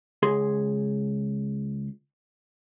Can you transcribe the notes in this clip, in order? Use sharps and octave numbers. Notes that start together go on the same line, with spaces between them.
C#2 G#4 C6